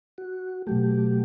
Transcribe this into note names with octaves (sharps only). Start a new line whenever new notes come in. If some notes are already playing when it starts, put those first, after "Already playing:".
F#4
B2 F#3 A3 G4